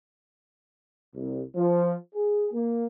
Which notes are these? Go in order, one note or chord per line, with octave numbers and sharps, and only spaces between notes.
C2
F3
G#4
A#3